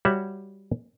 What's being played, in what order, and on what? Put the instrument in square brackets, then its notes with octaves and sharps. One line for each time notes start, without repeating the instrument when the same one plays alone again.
[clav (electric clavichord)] G3 F#4 C#5 E5 F#5